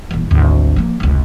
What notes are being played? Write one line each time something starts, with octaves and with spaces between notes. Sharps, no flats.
D#1 E2
G#1 D2
F3 A#3
F1 C#2